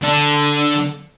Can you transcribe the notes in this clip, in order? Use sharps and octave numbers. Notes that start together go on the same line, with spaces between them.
D3 D4